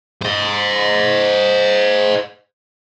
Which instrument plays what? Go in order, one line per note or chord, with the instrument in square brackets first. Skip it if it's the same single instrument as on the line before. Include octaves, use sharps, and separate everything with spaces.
[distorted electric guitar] C5 D#5